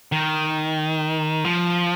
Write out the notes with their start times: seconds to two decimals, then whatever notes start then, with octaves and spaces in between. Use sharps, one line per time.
0.12 D#3
1.45 F3